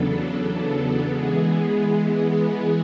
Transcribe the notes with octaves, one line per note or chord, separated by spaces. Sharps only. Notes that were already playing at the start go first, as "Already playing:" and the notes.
Already playing: E2 C#3 F#3 B3 D4 A4
E3 G#3 B3 G#4